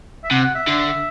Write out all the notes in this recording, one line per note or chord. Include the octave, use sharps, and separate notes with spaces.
E5
C3 F#5
F#5
E5
D3